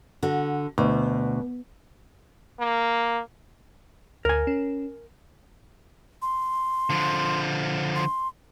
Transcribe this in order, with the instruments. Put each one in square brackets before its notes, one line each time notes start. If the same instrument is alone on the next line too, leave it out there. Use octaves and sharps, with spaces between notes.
[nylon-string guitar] D3 F#4
[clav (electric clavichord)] D2 [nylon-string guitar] B2
[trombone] A#3
[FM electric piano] D2 [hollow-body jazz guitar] A#4 G#5
[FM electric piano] C#4
[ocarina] C6
[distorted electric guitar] D3 F3
[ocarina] C6